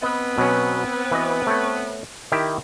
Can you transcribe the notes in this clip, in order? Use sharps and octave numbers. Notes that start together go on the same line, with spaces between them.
B3 C4 B4 D#5
B2 F#3 C#4
E3 F#4 D#5
A3 C#5
D#3 E4 G4